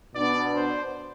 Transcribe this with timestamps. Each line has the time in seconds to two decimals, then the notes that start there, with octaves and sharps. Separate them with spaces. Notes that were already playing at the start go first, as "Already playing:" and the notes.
0.15 B2 B3 D4 D5
0.54 C5